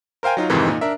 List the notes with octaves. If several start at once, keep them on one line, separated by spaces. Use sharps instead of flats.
A#4 C5 F5 G5 G#5
F#3 D#4 F4
F2 G#2 C3 D#3 E3
A#2 D#4
D4 A#4 E5